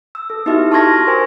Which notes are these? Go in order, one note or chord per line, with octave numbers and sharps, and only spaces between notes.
E6
A4
B3 D#4 E4 F#4 G4 E5
A5 C6 C#6 F6 G#6 A#6
A#4 C5 G5 G#5